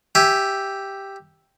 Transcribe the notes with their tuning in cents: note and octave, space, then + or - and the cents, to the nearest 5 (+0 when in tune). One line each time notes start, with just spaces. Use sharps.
G4 +0 E5 +0 G#5 +0